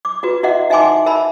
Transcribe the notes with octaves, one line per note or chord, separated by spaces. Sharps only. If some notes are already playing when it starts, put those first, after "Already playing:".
D6
F4 F#4 B4
E4 F#4 D#5 E5 F#5
D#4 E5 G5 G#5 C6 D6
A#4 E5 A5 B5